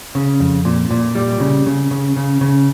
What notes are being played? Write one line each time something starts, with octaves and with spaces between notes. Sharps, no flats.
C#3
F2
A#2
A#2
G3
C#3
C#3
C#3
C#3
C#3